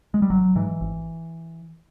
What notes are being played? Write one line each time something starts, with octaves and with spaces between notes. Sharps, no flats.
G#3
G3
G#1 F#3
G#2 E3
G#1